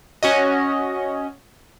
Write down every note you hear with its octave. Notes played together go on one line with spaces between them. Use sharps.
C#4 F#4 D#5